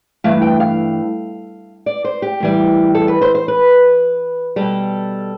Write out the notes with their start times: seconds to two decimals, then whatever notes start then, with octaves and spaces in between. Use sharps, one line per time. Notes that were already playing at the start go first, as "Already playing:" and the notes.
0.24 G2 E3 A3 F5
0.42 G5
0.60 F5
1.86 D5
2.04 C5
2.22 G4
2.40 A2 E3 G3
2.95 A4
3.08 B4
3.21 C5
3.35 C5
3.48 B4
4.56 B2 G3 A4